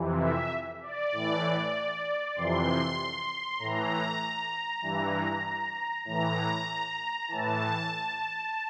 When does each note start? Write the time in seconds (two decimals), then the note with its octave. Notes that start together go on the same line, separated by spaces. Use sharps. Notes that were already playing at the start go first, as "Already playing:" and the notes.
Already playing: F2 C3 E3
0.20 E5
0.82 D5
1.12 A2 E3
2.36 F2 C3 E3 C6
3.59 A2 E3 A#5
4.82 G2 E3
6.04 A2 E3 A#5
7.27 A2 E3 A5